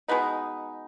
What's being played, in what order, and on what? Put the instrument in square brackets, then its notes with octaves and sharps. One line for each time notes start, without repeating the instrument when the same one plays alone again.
[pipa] B2 G#3 B3 D#4